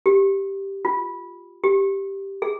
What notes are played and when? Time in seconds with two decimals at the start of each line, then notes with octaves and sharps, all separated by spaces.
0.06 G4
0.85 F4
1.64 G4
2.42 G#4